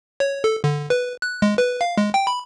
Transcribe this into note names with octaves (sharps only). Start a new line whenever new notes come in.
C#5
A4
D3
B4
F#6
G#3
B4
F5
G#3
G5
B5